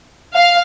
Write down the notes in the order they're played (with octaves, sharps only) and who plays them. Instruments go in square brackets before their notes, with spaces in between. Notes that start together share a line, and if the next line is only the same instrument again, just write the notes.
[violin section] F5